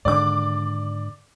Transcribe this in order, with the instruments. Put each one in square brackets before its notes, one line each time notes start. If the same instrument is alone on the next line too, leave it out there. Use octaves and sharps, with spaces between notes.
[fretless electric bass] G#2 D3 D#3 [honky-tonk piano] D5 D6